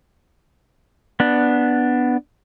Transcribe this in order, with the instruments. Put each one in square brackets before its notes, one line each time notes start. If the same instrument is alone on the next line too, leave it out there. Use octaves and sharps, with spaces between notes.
[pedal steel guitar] B3 D4